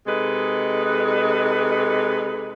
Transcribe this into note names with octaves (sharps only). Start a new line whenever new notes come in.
C3 G#3 D#4 A4 B4